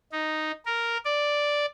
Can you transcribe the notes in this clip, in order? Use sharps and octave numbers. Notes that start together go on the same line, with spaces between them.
D#4
A#4
D5